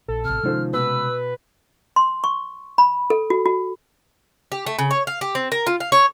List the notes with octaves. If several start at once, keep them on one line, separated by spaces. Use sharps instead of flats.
A#1 A4
A1 C3 F6
C3 D#3 F3 G#3 C#4 C5
B2 B4 E6
C6
C#6
B5
A4
F#4
F#4
G4
A3
C#3
C#5
F5
G4
C4
A#4
F4
F5
C#5